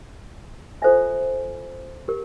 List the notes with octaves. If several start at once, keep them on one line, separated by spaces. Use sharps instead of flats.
F4 A4 C5 E5 G#5
G4 A#4